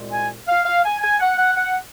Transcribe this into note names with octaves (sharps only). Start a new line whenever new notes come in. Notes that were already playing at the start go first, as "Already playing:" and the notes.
Already playing: C2 A#2 G#3
G#5
F5
F5
G#5
G#5
F#5
F#5
F#5